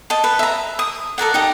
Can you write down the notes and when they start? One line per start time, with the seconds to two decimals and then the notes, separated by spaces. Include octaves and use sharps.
0.10 D#5 A5
0.24 B4
0.39 E5 A#5
0.79 D#6
1.18 A4 A#4 D5 F#5
1.34 D#4 G4 D#5